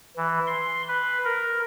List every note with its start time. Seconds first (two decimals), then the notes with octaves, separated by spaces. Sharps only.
0.16 E3
0.47 C6
0.88 B4
1.25 A#4